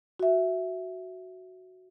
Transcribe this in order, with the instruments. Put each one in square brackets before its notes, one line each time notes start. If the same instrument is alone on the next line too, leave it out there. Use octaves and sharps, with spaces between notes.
[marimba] F#4 E5